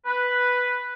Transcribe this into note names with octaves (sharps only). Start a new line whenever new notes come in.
B4